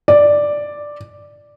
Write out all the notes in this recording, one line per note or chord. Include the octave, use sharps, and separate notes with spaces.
D5